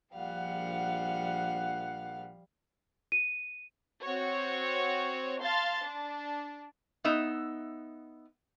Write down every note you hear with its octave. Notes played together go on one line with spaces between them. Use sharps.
A#1 F3 G3 F5 F#5
D#7
C4 F#4 C#5
F5 A5 C6 A6
D4
B3 D#4 E5